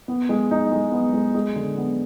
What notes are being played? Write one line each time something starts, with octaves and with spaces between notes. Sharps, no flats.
B3
G#3
D#4
G#3
B3
G#3
G#3
D3
B3